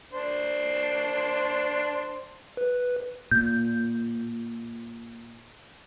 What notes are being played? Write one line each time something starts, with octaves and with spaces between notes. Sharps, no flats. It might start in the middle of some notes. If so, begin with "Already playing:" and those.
D4 C5
B4
A#2 G6